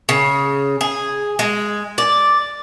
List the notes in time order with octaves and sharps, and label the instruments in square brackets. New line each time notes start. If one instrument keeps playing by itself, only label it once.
[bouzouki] C#3
G#4
G#3
D5